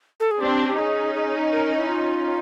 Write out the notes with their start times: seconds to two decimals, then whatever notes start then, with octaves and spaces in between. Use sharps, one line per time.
0.20 A4
0.31 G#4
0.40 C4 D4 G4
0.68 G4
0.78 C#4 D#4 G#4
1.15 G#4
1.52 A#4
1.77 E4
1.89 F4